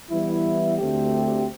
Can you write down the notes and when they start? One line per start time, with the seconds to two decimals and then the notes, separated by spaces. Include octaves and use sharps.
0.10 E3 G3 B3 E4
0.79 D2 D3 A3 C4 G4